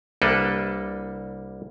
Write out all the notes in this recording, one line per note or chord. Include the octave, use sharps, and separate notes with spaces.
C2 G3 A#3 D4 A4 B4